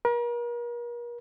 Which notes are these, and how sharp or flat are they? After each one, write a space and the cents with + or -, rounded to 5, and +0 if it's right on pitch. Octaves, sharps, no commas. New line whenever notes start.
A#4 +40